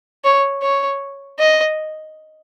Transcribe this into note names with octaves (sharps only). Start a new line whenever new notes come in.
C#5
C#5
D#5